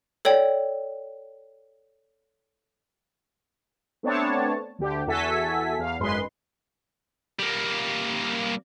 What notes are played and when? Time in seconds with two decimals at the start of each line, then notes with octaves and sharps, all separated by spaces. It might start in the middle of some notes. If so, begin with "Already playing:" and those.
0.25 A4 C#5 D5 G5
4.03 A3 B3 C4 D4 C#5 A5
4.79 D2 D3 G4
5.07 E2 F#4 A4 E5 G#5 B6
5.79 E2 F5
5.99 G#1 F#2 G#3 B4 C6
7.39 G3 A#3